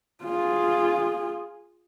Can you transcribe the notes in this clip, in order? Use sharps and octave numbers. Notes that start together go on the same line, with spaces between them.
F4 G#4